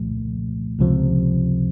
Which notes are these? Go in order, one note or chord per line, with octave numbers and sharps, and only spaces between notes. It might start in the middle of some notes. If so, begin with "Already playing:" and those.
Already playing: C2 A#2 F3 A3
C#2 C3 F3